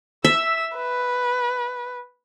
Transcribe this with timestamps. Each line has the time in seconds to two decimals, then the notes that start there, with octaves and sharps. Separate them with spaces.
0.25 E5 E6
0.76 B4